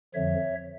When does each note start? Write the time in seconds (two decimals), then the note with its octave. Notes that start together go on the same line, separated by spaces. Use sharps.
0.14 F2 D3 F3 C#5 E5